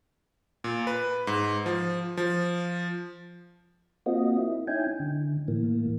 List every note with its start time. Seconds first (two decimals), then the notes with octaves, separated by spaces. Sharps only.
0.64 A#2
0.87 B4
1.27 G#2
1.66 F3
2.17 F3
4.06 A#3 C4 F4 F#4 D#5
4.38 E4
4.68 C#4 D#4 E4 G5 G#5
5.00 D3
5.48 A2 E3 A#3